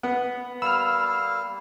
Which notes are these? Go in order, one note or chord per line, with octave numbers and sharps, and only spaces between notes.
B3 F#5
G3 A#3 F5 B5 E6 F6